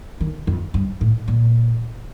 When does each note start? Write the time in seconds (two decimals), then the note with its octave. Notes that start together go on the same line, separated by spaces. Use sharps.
0.21 D#3
0.47 F2
0.74 G2
1.01 A2
1.28 A#2